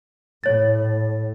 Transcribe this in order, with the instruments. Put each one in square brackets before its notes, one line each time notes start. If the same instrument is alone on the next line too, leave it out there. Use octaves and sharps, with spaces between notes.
[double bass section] A2 [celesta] C#5 A6